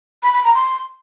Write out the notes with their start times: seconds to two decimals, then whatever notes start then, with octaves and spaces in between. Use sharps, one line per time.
0.23 B5
0.34 B5
0.44 A#5
0.55 C6